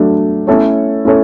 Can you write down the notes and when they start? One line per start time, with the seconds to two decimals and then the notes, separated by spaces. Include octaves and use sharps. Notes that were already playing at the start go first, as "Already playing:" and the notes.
Already playing: F#3 A3 D4
0.47 A3 C#4 E4 A4 C#5
1.05 A3 C#4 E4 A4 C#5